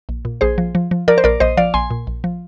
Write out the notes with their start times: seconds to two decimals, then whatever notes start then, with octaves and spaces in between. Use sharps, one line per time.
0.09 A#1
0.25 A#2
0.41 A#1 G#4 C5
0.58 F3
0.75 F3
0.91 F3
1.08 F3 A#4 D5
1.18 C5
1.24 A#1 A#4 D5
1.40 A#1 C5 D#5
1.57 F3 D5 F5
1.74 A#1 G#5 C6
1.90 A#2
2.07 A#1
2.24 F3